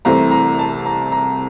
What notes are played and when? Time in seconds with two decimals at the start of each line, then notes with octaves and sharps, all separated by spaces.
0.05 C2 C3 E3 A3 C4 A#5
0.31 A#5
0.59 A5
0.86 A#5
1.12 A#5